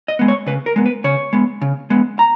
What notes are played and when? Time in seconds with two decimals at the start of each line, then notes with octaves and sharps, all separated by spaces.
0.08 D#5
0.19 G#3 B3
0.28 C#5
0.47 C#3 B4
0.66 A#4
0.76 G#3 B3
0.86 B4
1.04 C#3 C#5
1.33 G#3 B3
1.62 C#3
1.90 G#3 B3
2.19 A#5